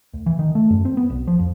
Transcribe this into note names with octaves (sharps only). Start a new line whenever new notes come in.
D2
E3
D#3
A3
F#2
C4
B3
B1
F3
F2